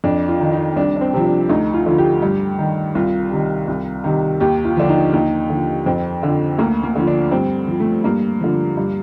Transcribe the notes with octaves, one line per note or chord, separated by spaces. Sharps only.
F2 D4
F4
D#3
D#4
C2 D4
D4
C4
C3 F3 C4
D4
D2 D#4
F4
D3 F3
G4
G2
D#3
C2 F4
C3 D#3
C2
C3 D#3
D#2 G4
F4
D3 F3 D4
D#4
D#2 D#4
D3 F3
F2 C4
D3 F3
D2 A#3
A#3
D3 F3
D4
G2 C4
F3
A3
G2 A#3
D3 F3
G2